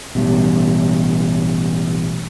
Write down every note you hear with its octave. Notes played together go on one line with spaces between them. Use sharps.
A1 B2 G3